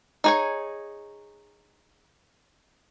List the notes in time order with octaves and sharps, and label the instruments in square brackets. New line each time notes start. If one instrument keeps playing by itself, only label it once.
[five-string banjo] D#4 G#4 C#5